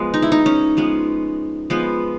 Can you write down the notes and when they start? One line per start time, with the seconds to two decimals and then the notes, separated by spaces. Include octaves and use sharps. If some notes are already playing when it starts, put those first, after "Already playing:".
Already playing: F3 G#3 B3
0.14 D#4
0.22 E4
0.32 D#4
0.46 C#4
0.77 F3 G#3 B3
1.70 F3 G#3 B3